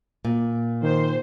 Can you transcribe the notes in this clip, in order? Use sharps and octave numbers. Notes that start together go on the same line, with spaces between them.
A#2
D#3 C5